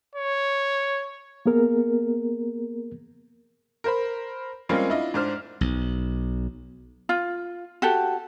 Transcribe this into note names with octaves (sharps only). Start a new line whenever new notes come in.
C#5
A#3 B3 G#4 A#4
A#4 C5 B5
G3 G#3 A#3 C4 C#4 F4
D4 E4 F4 D#5
G#2 D4 C5 F6
B1
F4
F#4 G4 A4